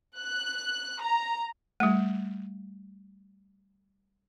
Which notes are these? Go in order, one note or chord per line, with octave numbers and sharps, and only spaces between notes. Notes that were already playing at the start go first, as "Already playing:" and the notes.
F#6
A#5
G3 A3